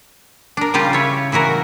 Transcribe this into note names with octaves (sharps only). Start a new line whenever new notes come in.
D4 A#4
C#3 G3 F4 G4
E4 C#5
E3 E4 F#4 A#4